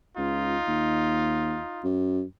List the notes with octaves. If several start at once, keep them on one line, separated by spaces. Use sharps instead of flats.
C#2 D#4 F4
D#2
F#2